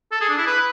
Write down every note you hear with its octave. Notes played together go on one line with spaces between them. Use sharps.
A4
G#4
D4
E4
B4